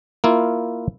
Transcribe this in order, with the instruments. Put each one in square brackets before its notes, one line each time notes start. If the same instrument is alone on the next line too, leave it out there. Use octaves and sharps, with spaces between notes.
[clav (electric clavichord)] A#3 E4 F4